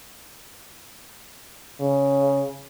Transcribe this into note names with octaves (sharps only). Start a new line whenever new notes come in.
C#3